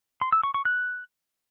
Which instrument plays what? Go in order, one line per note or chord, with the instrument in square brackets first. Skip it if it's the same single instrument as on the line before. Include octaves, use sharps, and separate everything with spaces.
[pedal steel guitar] C6
E6
C#6
C#6
F#6